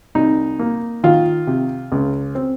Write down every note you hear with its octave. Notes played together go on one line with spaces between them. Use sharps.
C2 D#4
A#3
D#3 F4
C3
C#2
C4